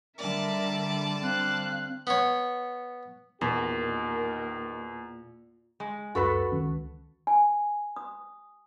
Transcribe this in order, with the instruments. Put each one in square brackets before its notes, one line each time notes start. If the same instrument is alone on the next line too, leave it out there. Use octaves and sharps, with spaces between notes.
[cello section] D3 G3 [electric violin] A#4 E5 [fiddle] D5 A5
[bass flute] C4 [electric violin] F5 F#6
[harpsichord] B3 C#5
[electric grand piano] E2 [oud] A#2 [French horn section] D#3 G4 A#4
[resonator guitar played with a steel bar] G#3
[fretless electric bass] C#2 F#2 [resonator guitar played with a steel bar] F#4 A4 B4
[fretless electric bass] C#2 D#3 C#4
[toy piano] G#5
D#6